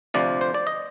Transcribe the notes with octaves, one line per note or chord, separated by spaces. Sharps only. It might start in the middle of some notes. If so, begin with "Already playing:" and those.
D2 C3 F3 D5
C5
D5
D#5